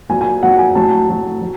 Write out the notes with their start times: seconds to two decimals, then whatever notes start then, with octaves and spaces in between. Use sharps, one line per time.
0.09 A#2 F#3 G#5
0.21 G#5
0.43 A#2 F#3 F#5
0.59 G#5
0.75 A2 F#3 A5
1.09 A2 F#3
1.42 F#3